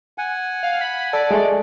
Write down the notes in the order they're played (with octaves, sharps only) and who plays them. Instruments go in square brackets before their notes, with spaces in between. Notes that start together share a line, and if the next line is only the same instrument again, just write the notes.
[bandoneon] F#5 G#5
[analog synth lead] F5
B5
[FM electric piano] A4 [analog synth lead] D5
[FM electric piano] G#3 A3